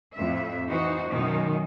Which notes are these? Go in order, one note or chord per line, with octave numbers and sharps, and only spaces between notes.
F2 A2 E5
E3 D#4 F#4 C5
F#2 B2 D#3 D#4